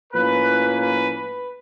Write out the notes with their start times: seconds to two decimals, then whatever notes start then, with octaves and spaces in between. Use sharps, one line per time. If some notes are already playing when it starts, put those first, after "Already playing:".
0.13 A2 F3 A#3 C#4 B4
0.80 B4
1.13 B4